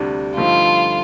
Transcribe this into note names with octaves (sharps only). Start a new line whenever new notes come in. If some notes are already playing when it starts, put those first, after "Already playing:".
Already playing: D2 C3 G3 D4
G2 D3 F3 A3 D#4 F4